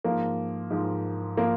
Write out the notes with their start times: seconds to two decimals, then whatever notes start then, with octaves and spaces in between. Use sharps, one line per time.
0.04 G#2 F3 A#3
0.70 G#2 F3
1.37 F3 A#3